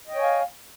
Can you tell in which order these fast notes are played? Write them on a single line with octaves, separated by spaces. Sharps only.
D#5 G5 C#5 G#5 F5